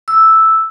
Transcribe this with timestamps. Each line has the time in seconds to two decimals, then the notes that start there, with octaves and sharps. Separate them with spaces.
0.08 E6